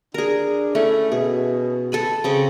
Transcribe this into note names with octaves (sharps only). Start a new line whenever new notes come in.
D4 G#4 A#4
A3 C#4 E4
B2 G#4
A4 G#5 B5
C#3 C4 D#5